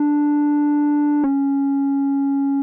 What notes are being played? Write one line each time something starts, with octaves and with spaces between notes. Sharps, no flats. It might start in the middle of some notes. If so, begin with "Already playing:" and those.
Already playing: D4
C#4